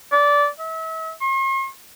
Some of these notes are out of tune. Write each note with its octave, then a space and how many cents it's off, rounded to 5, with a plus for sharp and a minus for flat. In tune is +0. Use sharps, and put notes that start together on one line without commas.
D5 -20
E5 -35
C6 +45